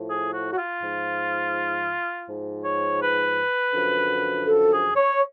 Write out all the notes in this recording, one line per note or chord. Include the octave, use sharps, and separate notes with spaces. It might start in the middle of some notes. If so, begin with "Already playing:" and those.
Already playing: A2 F3
G#4
F#4
F#4
F4
G#2 F3
G#2 F3
C#5
B4
F#2 D3 F3
A4
G#4
C#5